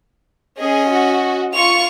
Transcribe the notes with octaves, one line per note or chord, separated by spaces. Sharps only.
C#4 G#4 D#5
F#4
F4 C#6 C#7 F7